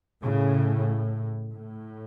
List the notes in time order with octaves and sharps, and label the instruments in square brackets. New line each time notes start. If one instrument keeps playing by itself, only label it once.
[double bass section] A2 C#3
A2